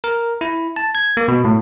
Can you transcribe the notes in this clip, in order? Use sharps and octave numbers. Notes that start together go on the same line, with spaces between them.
A#4
E4
A5
G#6
A#3
B2
A2